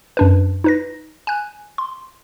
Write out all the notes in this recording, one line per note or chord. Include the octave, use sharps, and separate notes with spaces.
F#2 D4 B4
D#4 B4 A#6
G#5 F#6
C6